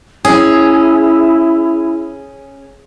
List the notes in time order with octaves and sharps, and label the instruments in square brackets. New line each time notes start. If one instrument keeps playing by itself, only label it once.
[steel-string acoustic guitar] C#4 [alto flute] E4 [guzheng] G#4